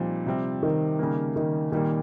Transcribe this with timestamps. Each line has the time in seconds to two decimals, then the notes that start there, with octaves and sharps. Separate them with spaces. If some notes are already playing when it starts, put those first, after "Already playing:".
Already playing: A#2 F3 G3 C4 D#4
0.26 C3 G3 C4
0.63 D#3
0.99 C#3 G3 A#3
1.36 D#3
1.72 A#2 D#3 G3 A#3